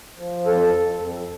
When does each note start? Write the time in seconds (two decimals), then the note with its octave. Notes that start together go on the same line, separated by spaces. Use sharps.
0.18 F3
0.46 F2 A4
0.74 F2
1.01 F2